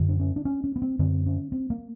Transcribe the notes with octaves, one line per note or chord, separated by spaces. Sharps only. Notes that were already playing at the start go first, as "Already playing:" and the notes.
Already playing: F#2 D3
D4
C#4
D4
C#4
C#4
B3
C4
F#2 D3 C4
C#4
C4
A#3